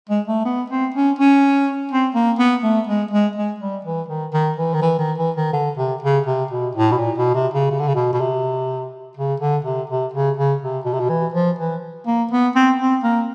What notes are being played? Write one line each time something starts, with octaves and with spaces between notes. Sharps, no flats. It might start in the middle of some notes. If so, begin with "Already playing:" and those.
G#3
A3
B3
C4
C#4
C#4
C4
A#3
B3
A3
G#3
G#3
G#3
G3
E3
D#3
D#3
E3
D#3
E3
D#3
E3
D#3
D3
C3
C#3
C3
B2
A2
B2
A#2
B2
C3
C#3
C#3
D3
C#3
B2
B2
C3
C#3
D3
C3
C3
C#3
C#3
C3
B2
C3
B2
E3
F3
E3
A#3
B3
C4
C4
A#3